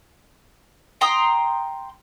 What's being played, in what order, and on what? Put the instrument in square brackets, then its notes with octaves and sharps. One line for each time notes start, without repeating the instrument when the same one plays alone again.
[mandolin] G5 A#5 C6 D#6